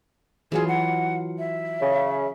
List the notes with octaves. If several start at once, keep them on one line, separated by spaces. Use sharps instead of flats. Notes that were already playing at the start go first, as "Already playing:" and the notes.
E3 F#3 F4 G#4
F#5
E5
C#3